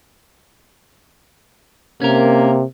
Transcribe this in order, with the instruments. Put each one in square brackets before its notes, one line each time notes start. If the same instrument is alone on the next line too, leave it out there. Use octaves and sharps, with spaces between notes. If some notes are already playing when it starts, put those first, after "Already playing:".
[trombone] C3 [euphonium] A#3 [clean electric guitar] C#4 A#4